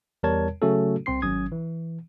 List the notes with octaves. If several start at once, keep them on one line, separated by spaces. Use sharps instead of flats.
E2 G3 A#4 C#5 A5 G#6
C#3 F#3 A3 C#4 F#4 A4
C2 C4 C6 C7
G#1 F#3 C#4 D#6 G#6
E3